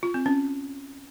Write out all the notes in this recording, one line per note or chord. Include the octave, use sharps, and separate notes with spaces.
F4
C4
C#4